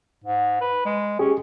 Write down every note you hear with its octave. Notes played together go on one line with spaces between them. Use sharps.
G#2
B4
G#3
C#4 G4 G#4